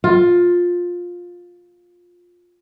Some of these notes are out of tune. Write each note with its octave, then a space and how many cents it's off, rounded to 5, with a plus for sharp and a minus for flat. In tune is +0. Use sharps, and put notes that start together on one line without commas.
F4 +15